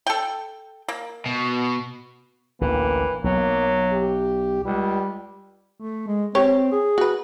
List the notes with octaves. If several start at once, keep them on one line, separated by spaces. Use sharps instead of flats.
A4 G5
A#3
B2
A1 D2 E3 A#3
B1 F#3 A#3
G4
C#2 G3
A3
G#3
C4 G4 C#5
G#4
F#4 B4